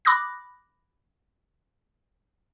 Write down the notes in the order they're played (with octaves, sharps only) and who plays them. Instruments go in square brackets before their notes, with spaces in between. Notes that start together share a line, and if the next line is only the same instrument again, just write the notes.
[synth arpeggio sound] B5 D6 D#6 F#6 A#6